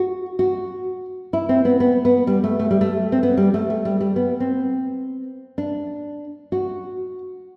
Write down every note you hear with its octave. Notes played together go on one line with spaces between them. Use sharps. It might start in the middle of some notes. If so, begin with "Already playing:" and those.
Already playing: F#4
F#4
E4
C4
B3
B3
B3
G3
A3
A3
G3
A3
C4
B3
G3
A3
A3
G3
G3
B3
C4
D4
F#4